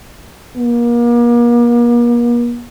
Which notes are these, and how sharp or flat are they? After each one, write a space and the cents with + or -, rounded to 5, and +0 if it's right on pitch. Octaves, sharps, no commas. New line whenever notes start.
A#3 +40